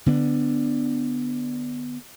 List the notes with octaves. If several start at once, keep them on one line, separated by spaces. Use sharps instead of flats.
D3 B3 D4